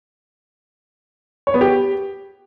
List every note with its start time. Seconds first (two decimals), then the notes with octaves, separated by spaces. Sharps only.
1.47 C#5
1.54 B3
1.61 G4